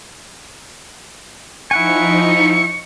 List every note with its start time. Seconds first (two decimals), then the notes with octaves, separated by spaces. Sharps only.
1.71 F3 D#4 E4 F#5 G#5 C#6